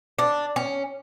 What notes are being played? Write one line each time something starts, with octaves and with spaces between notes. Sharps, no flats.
D4
C#4